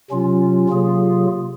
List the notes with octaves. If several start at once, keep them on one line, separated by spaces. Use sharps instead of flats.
C3 F#3 C#4 F4
C3 F#3 A#3 F4 G#4